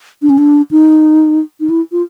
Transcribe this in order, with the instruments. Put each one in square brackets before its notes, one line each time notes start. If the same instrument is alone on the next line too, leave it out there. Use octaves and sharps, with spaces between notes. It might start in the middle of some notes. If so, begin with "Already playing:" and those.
[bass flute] D4
C#4
D4
D#4
D#4
E4
F4